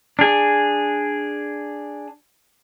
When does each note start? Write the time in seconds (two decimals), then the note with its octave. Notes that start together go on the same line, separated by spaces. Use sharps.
0.19 D4 G#4